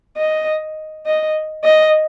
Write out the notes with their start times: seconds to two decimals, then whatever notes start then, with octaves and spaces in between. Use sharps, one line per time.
0.17 D#5
1.06 D#5
1.64 D#5